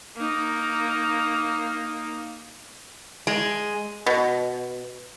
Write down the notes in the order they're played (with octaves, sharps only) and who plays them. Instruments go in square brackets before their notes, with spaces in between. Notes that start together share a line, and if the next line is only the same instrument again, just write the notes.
[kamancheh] A#3 D#4
[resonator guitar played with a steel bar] G#3
[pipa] B2